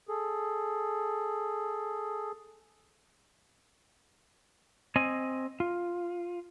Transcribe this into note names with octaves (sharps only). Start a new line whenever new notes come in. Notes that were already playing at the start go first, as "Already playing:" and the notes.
G#4 A4
C4 D#5 G#5
F4